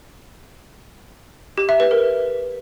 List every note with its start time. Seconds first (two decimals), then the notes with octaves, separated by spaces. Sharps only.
1.58 G4
1.69 E5
1.80 B4
1.91 A#4